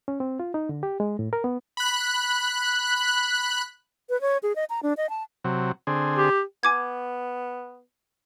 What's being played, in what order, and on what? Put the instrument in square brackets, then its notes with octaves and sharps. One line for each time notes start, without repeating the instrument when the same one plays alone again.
[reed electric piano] C#4
C4
F4
D#4
D3
G4
G#3
A2
A#4
B3
[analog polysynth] B5 F#6
[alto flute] B4
C#5
G#4
D#5
A#5
D4
D#5
A5
[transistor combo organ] C3 F#3
D3 C4 G#4
[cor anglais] G4
[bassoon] B3 [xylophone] G#5 D6 G#6